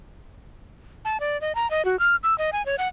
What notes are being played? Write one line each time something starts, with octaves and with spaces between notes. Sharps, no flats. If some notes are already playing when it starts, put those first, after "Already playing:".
A5
D5
D#5
A#5
D#5
F#4
F6
E6
D#5
G#5
C#5
F#5